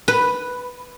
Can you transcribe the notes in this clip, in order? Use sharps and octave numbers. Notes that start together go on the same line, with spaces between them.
B4